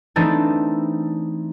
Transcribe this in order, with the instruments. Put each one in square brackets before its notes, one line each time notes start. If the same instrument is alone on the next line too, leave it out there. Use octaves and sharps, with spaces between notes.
[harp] E3 A3 C4 D4 D#4 A4